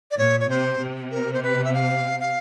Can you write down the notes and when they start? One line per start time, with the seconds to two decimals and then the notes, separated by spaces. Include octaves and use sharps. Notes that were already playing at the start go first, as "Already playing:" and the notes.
0.11 D5
0.18 A#2 C#5
0.40 C#5
0.49 C3 C5
0.80 C3
1.11 A#4
1.33 C5
1.43 B4
1.64 E5
1.74 F5
2.20 F5